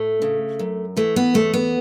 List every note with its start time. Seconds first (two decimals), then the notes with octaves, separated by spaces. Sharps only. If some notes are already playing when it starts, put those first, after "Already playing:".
Already playing: A2 A3
0.22 C#3
0.59 F#2
0.97 E3 A3
1.16 B3
1.34 E2 A3
1.54 B3